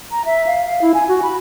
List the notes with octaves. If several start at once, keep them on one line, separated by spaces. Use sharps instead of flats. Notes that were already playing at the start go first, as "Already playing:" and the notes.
A#5
E5
F5
F5
E4
G#5
F#4
B5